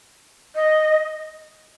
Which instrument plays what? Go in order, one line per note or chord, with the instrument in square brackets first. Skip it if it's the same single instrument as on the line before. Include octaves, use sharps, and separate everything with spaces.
[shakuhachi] D#5